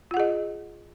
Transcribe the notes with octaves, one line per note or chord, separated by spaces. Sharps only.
F4 G#4 D#5 F#5